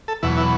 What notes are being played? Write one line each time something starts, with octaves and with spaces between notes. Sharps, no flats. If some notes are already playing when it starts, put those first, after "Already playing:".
A4
E2 B2 F#3 E4
E4